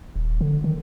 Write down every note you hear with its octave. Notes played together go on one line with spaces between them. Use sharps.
D#1
D3
D#3